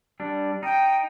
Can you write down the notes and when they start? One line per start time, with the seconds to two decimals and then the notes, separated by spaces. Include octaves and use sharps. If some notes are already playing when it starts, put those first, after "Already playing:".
0.20 G3 D4
0.63 D#4 G5